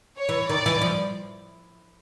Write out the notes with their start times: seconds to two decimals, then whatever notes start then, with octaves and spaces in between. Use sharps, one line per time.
0.18 C#5
0.29 E3
0.49 D#3 D5
0.66 E3
0.81 F3